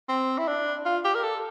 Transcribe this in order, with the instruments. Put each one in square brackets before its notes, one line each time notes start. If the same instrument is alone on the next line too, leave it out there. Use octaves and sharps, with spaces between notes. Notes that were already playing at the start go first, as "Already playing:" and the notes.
[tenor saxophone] C4
E4
D4
F4
G4
A#4
A4